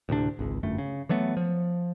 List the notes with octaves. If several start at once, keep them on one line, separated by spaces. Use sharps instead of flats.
D2 A2 C3 D4
G#1 C#2
G1 F#2 A3
C#3
E3 F#3 A3 B3
F3